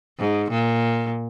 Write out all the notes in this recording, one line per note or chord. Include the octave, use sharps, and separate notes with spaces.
G#2
A#2